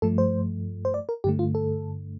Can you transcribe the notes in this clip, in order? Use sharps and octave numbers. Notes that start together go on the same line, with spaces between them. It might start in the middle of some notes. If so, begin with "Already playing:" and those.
G2 F3 A3 A4
C5
C5
D5
A#4
G2 D3 A3 G4
F4
A4